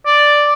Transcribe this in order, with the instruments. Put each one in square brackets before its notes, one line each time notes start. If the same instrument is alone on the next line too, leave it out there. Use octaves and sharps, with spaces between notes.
[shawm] D5